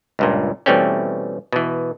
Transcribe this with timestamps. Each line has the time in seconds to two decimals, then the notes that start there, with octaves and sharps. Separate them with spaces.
0.19 C#2 G2 A#2
0.66 B2 E3 G3 A3 C4 C#4
1.53 B2 E3